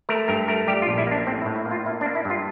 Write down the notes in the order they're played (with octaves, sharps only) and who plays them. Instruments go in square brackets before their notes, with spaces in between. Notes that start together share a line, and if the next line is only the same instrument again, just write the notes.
[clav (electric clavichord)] A3 A#4
G2 A#4
A3 A#4
G3 G4
F4
A#1
E4
A#3 D4
A2 C4
E4
A2
E4
A#3
F4
A#3 E4
D4
A#3
E4
G2 F4